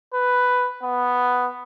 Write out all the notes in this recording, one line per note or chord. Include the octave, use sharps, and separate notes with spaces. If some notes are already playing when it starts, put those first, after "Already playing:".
B4
B3